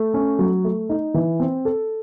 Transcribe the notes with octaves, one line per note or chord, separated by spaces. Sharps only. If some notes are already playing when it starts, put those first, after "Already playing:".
Already playing: A3
C#4
F#3
A3
D#4
E3
C4
A4